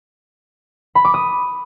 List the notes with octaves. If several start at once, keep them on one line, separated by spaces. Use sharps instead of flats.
B5
D6
D#6